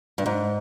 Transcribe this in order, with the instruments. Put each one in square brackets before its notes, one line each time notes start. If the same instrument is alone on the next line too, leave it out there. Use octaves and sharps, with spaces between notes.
[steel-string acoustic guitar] G2
G#2